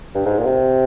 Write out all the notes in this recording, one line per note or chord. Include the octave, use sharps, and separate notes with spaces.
G2
G#2
A#2
C3